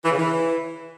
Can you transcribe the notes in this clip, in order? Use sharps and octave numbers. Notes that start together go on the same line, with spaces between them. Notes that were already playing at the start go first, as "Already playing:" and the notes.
E3
C#3
E3